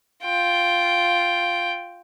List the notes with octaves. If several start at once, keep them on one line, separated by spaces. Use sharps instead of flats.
F4 G5